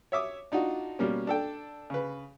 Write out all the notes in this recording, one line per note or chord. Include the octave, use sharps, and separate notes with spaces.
C#5 E5 D6 D#6
D4 D#4 F4 F#4
B2 G3 A#3 C#4
D4 A4 G5
C#3 B4